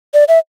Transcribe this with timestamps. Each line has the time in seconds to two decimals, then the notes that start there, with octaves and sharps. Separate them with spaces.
0.14 D5
0.28 E5